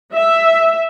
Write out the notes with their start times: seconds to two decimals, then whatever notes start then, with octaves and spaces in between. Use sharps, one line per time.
0.14 E5